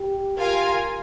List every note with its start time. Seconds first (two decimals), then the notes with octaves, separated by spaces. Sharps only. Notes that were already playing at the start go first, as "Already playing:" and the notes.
Already playing: G4
0.37 F4 G4 A#4 F5 G#5